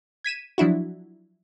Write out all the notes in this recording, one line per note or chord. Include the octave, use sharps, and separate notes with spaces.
G#6 B6 D#7 E7
F3 F#3 D4 E4 F#4